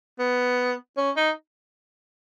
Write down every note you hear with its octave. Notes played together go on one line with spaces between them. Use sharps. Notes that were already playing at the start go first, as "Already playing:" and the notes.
B3
C#4
D#4